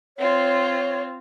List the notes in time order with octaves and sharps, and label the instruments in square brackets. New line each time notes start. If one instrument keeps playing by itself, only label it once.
[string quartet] C4 F4 [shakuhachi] C#5